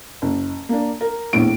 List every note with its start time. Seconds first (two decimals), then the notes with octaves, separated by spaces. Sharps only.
0.22 F#1
0.69 A#3 D4
1.01 A#4
1.33 A#1 E2 A2 D7